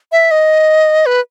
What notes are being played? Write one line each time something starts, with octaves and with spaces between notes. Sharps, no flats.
E5
D#5
B4